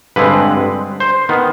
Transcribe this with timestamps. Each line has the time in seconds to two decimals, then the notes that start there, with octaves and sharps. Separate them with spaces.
0.16 G2 D3 G#3 C4 B4
1.00 C5
1.29 D#3 B3